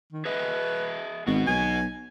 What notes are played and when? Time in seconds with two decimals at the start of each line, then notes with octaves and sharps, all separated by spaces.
0.13 D#3
0.25 G#4 B4 D#5 E5
1.27 G#1 B2 F#4
1.47 B1 G#5